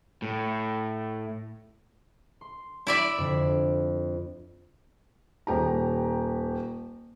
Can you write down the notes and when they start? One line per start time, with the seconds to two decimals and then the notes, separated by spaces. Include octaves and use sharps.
0.22 A2
2.41 C6
2.87 E4 D5 E5
3.18 F2 D3
5.47 D#1 G4 A#5